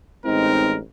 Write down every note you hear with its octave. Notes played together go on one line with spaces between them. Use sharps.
A1 G#3 C4 D#4 A#4